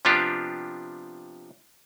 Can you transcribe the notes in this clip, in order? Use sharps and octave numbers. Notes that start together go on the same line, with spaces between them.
C3 F3 B3 D4 F4 G4